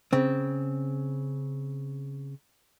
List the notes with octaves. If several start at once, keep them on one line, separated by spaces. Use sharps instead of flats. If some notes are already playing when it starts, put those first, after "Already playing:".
C#3 C4